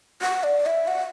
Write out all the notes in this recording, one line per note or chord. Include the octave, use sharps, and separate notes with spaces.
F#5
D5
E5
F#5